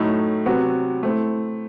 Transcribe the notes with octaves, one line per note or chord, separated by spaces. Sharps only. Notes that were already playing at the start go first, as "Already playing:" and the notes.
Already playing: A2 F#3 A3 D#4
C3 F#3 B3 F#4 B4
A3 C4 E4